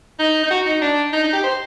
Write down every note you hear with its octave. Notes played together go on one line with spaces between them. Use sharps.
D#4
D#4
F#4
D#4
D4
D#4
D#4
G4
C5